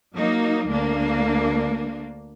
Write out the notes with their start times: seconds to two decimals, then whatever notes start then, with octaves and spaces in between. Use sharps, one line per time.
0.15 F#3 A#3 D#4
0.68 D2 A#3 D4